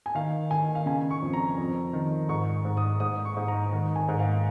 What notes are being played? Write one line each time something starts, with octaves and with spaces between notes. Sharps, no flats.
G#5
D#3 F5
D#3 G#5
F5
C#3 G#5
C#6
F2
A#5
F2
D#3
G#2 C#6
G#2
D#6
G#2 D#6
C#6
G#2
A#5
D#3
G#5
G#2
F5